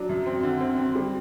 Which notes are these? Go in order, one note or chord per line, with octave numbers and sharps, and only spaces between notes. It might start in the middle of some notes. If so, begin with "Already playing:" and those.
Already playing: F#3 D4
F#2
C4
D3
C4
C4
G3